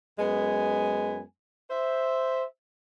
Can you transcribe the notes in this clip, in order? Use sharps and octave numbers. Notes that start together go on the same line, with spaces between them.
F#2 G#3 B3 G#5
C5 E5